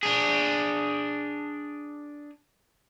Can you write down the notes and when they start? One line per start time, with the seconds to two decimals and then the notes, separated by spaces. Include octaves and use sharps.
0.03 D4 G#4